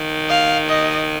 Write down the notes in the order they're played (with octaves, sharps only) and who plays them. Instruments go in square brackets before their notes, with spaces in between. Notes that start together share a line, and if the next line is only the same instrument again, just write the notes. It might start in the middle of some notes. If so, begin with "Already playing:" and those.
Already playing: [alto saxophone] D#3
[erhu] F5
D#5